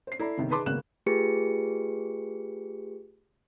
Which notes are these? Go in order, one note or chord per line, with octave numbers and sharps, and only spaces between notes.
C5 C7
E4 A4 D5 A#5
G1 C3 D#3
D#4 G#4 B4 A5 C6 D6
G#1 C#3 A#3 B3 F#6 E7
A3 F4 G4 G#4 B4 C#7